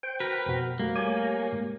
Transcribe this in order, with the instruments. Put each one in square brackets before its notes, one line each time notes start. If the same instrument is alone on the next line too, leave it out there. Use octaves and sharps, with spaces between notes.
[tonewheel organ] C5 G5
[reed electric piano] F#4 [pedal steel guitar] A#4 B4
[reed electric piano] F2 B2 F#4
[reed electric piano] G3 A3 [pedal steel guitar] A#3
[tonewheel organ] G4 C#5 G#5
[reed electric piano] G#2